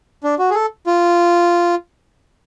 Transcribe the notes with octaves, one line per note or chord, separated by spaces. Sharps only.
D4
F#4
G#4
A4
F4